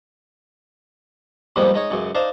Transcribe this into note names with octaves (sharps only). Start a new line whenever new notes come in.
F2 G#2 F3 G3 A#3 B3
G#3 D#4 C#5
C#2 F#2 C#3
D4 D#4 C5 F5 A5